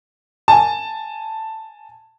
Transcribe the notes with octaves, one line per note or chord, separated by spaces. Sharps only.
G#5 A5